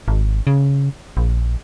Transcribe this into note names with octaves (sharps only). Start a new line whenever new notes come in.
G#1
C#3
A#1